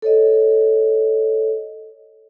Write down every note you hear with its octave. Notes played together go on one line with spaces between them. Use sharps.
A4 C#5 D#5